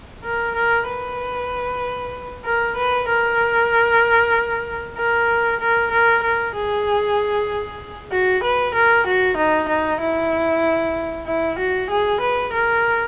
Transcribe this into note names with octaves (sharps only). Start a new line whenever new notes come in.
A#4
A#4
B4
A#4
B4
A#4
A#4
A#4
A#4
A#4
G#4
F#4
B4
A#4
F#4
D#4
D#4
E4
E4
F#4
G#4
B4
A#4